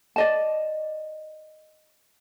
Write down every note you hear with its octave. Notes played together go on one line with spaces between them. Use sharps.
D5 D#5 A5